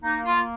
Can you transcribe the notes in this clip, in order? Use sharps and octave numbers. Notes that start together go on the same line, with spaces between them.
A#3 D#4
F4
A#3